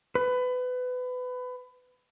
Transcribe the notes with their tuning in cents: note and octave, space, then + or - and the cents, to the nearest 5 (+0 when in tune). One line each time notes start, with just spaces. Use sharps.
B4 +25